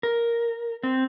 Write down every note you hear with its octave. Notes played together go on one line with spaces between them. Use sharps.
A#4
C4